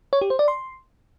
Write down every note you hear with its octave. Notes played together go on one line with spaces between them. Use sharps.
C#5
G4
C5
D5
C6